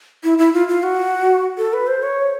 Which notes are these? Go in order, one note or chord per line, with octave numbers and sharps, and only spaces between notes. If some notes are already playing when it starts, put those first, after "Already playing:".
E4
E4
F4
F4
F#4
A4
B4
C5
C#5